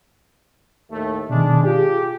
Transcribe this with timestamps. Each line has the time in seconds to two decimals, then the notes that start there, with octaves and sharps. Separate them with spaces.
0.91 D#2 A2 A3
1.30 B2 D#3 G#3 D4
1.64 F4 G4 G#4